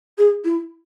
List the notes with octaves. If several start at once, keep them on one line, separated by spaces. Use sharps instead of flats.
G#4
E4